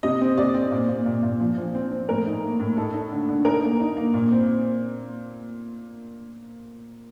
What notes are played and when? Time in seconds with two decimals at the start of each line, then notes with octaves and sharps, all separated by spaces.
0.03 C3 D#5
0.21 C4
0.37 C3 D5
0.54 C4
0.71 A#2
0.89 A#2
1.06 A#2
1.23 A#2
1.40 F3
1.57 F3
1.75 C4
1.91 C4
2.09 A2 A#4
2.26 D#4
2.43 A#3
2.60 A2
2.77 D#4 A4
2.94 D#4
3.12 D3
3.28 D3
3.45 D#4 A#4
3.63 A#3
3.80 D#4
3.96 A#3
4.14 A#2
4.31 C4